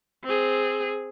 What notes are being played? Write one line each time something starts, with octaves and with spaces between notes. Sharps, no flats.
C4 G#4